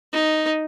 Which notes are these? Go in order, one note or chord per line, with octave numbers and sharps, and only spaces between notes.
D#4